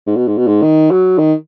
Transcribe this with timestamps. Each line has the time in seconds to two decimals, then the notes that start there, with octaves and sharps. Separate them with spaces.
0.07 G#2
0.16 B2
0.28 G#2
0.38 B2
0.47 G#2
0.63 D#3
0.91 F#3
1.18 D#3